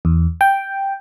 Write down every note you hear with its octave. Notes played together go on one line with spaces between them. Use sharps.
E2
G5